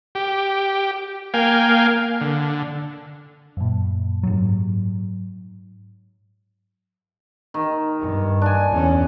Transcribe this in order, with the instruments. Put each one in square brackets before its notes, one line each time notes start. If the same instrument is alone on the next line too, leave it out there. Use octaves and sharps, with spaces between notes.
[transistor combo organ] G4
A#3 F5 G5 G#5
D3
[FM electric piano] F#2 A#2
[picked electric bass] G#2 F#3
[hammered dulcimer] D#3
[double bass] G2
[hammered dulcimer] D4 G#5
[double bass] E2 C#4